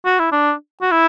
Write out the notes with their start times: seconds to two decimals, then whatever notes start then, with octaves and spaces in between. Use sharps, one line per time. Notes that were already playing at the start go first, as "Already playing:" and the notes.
0.05 F#4
0.19 E4
0.32 D4
0.81 F#4
0.91 E4